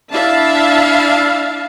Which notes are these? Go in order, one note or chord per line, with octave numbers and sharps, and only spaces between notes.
D4 E4 E5 F5 A5